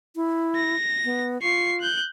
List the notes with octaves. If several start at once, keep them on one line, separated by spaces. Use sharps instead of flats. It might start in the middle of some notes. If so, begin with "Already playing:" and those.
E4
A#6
B3
F4 C#6 C7
F#6 G6